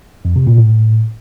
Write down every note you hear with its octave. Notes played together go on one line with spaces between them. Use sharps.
F2
C3
A#2
A2